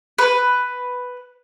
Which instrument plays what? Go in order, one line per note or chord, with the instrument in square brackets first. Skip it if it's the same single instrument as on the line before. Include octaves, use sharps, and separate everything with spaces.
[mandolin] B4